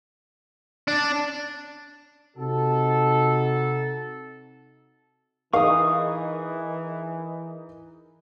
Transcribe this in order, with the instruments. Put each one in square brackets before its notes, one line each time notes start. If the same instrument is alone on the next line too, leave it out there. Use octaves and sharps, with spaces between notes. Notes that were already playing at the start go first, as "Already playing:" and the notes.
[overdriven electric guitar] D4
[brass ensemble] C3 D#4 F#4 A4
[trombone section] E3 [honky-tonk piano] D#4 G#4 A#4 [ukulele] F5 [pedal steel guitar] C#6 D#6